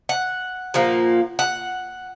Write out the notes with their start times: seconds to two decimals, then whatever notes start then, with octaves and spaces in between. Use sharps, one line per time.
0.09 F#5
0.74 A#2 F3 A#3
1.39 F#5